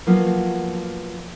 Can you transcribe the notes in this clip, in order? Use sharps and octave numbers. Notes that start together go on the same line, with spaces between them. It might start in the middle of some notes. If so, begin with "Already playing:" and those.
F3 F#3 A#3 B3 F4